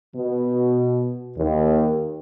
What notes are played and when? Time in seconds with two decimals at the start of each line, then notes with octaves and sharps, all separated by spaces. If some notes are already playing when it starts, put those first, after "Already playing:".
0.16 B2
1.38 D#2